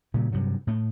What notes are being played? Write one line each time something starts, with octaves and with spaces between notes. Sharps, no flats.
A#2 C#3 G3
G2 C3 F#3
A2 A3